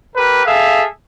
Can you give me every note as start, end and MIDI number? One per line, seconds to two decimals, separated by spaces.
0.16 0.41 67
0.16 0.41 70
0.16 0.41 71
0.46 0.85 68
0.46 0.85 69
0.46 0.85 76
0.46 0.85 77